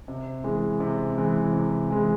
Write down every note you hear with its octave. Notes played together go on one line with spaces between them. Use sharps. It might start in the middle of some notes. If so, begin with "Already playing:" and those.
C3
E3 G#3
C3
E3 G#3
C3
E3 G#3